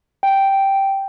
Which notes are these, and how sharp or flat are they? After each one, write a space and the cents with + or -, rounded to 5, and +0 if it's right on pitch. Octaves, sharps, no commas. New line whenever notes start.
G5 -5